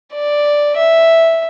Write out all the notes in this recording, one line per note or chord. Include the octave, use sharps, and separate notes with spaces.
D5
E5